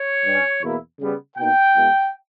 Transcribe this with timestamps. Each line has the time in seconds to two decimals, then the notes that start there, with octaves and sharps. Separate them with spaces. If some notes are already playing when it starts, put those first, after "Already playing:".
Already playing: C#5
0.26 G2 G3 C#4
0.63 E2 B2 A#3 E4
1.01 C#3 G3 B3
1.38 B2 A#3 D#4 G5
1.75 B2 G#3 B3 E4